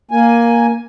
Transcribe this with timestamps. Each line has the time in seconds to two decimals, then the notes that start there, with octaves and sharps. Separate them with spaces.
0.11 A#3 G#5